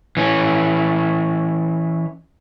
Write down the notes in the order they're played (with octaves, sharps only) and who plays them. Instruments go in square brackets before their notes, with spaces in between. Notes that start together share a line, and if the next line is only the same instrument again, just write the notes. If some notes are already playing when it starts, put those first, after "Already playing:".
[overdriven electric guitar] E3 C#4